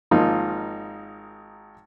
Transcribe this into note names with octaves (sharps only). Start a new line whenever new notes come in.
G#1 F3 A#3 D#4 F4